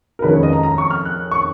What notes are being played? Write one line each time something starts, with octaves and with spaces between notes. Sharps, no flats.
A#4
F2 D#3 G#3 C#4 B4
C#5
D#5
A#5
A#5
C#6
F6
F#6
C#6